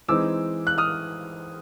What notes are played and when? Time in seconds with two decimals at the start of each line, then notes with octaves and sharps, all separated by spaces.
0.09 E3 G#3 C4 D#4 D6 E6
0.67 F#6
0.78 D#6 F6